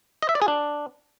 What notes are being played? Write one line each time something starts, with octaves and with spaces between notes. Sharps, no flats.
D#5
E5
D5
G#4
D4